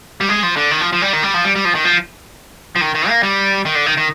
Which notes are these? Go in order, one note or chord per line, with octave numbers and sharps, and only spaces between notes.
G3
G#3
F3
D3
D#3
F3
F3
G3
D#3
G3
F3
G3
G3
F3
D#3
F3
F3
D#3
D#3
A#3
G3
D#3
D3
D#3
D#3